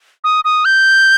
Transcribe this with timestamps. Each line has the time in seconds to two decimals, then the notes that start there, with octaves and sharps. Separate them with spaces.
0.24 D#6
0.45 D#6
0.65 G6